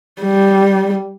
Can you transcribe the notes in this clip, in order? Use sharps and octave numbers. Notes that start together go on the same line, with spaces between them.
G3